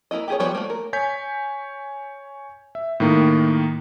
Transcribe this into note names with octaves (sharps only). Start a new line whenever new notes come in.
A#3 D#4 E4 D#5
G4 G#4 C#5
F3 G3 B3 C5 C#5
A3 A#3
A#4
C#5 G#5 G6 B6
E5
A2 D#3 A#3 D#4